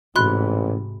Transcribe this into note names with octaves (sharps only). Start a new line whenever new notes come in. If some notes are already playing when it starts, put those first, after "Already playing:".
A1 G#2 C3 F#4 D#5 B5 C6 F#6